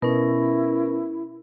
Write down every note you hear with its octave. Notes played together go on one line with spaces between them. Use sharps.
B2 C#4 E4 A#4